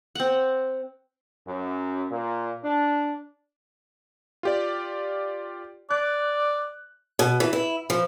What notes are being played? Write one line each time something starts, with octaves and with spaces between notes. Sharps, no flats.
C4 F#5
F#2
A#2
D4
F4 G4 D5
D5 F#6
B2
E3
E4
F3